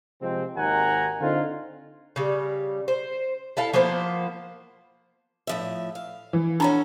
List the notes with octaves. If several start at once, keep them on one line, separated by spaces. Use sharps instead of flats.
C3 F3 G#3 C4
G#1 D#2 D#3 F#5 G#5 A#5
D3 C4 D#4 F4
C#3 G3
C5
E4 A4 F5
F3 A#3 B3 C5
A2 F3 E5
F5
E3
C#4 D4 F#4 A4 A#5 B5